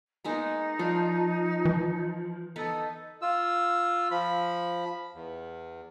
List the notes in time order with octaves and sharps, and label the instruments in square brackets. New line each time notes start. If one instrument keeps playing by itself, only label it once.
[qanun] G#3 A#3 B3 [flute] D#4
[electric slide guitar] F3 [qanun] D4
[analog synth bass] E3
[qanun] B3 D#4 B4 [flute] A4
[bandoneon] F4 E6
F3 B5
E2